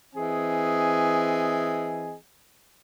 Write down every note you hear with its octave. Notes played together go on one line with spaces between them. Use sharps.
E3 C4 G#4 D#5 G#5